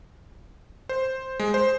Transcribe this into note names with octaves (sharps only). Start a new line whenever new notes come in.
C5
G#3
C5